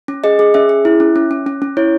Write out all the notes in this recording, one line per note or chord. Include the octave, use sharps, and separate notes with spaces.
C#4
G#4 D#5
G#4
C#4 E5
G#4
E4
C#4
C#4
C#4
C#4
C#4
E4 C#5